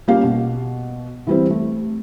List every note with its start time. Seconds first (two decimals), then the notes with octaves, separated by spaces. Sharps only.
0.08 G3 A#3 C#4 F4 G4 F5
0.23 B2
1.27 E3 G3 C4
1.50 A3